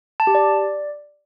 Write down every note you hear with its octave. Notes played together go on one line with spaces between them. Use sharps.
A5
G4
D5